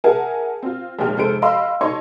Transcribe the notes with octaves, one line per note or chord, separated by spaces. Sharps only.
G#4 A#4 E5 F#5 G#5 A5
C4 F4
A#1 D#2 G#3 G5 F6
F1 F2 G#3 A4 C5 D7
D#5 F5 B5 C6 E6
D#4 C#5 D#5 A5 C6 C#6